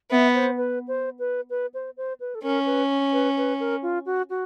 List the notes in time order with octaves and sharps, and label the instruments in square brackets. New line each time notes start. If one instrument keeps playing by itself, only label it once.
[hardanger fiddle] B3 [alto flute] E5
[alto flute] C5
B4
C5
B4
B4
C5
C5
B4
A4
[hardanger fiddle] C#4 [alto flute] A#4
[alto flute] B4
B4
B4
A#4
F4
F#4
F#4